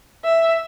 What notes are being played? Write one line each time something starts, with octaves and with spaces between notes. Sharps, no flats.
E5